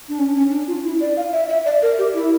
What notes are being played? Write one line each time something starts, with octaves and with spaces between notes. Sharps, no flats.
D4
C#4
C#4
D4
F4
E4
D5
F5
E5
E5
D5
A#4
G4
E4